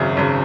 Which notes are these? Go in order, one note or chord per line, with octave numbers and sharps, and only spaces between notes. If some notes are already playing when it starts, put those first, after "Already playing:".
Already playing: G#1 F#2 C#3
G#1 F#2 C#3